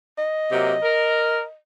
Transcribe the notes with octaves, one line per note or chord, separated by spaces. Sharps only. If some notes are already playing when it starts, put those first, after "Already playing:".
D#5
C3 F#3 A#3
A#4